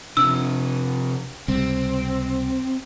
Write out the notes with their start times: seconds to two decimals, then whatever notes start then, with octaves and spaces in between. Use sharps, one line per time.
0.17 C3 F3 D4 E6
1.48 C#2 C3 G3 C4